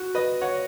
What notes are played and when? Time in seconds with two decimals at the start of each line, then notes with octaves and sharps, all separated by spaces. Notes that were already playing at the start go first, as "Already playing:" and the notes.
Already playing: F#4
0.15 B4 D#5
0.41 C#5 F#5